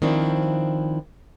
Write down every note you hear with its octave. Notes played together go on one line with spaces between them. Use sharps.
D#3 F3 C4 D4 E4